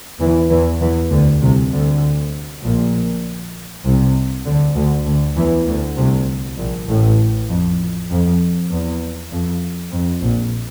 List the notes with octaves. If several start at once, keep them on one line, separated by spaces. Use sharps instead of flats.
E2 E3
E2 E3
E2 E3
D2 D3
C2 C3
D2 D3
A#1 A#2
C2 C3
D2 D3
D2 D3
D2 D3
E2 E3
D2 D3
C2 C3
A#1 A#2
A1 A2
F2
F2
E2
F2
F2
A#1 A#2